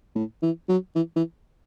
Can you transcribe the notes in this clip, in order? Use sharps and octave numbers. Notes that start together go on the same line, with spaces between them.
A2
E3
F#3
E3
E3